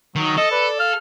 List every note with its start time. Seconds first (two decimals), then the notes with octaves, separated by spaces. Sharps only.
0.16 D#3 F#3
0.37 A4 D#5
0.51 B4 D5
0.80 F5 F6